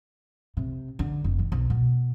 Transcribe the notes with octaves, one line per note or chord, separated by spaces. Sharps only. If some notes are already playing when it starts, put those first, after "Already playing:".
C3
D3
F1
D#3
B1
B2